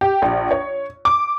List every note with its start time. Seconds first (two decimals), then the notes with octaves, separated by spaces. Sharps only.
0.01 G4
0.22 A#1
0.51 C#5
1.05 D6